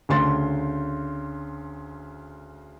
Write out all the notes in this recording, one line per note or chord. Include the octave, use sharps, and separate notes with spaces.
D2 C#3 C6 A6